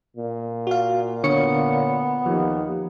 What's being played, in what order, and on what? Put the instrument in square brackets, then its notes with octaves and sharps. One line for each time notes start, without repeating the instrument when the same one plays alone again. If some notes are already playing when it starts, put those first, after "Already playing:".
[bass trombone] A#2
[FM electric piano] F#4 F5
[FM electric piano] D3 C#5 C#7 [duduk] B3
[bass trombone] D#2 [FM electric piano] F3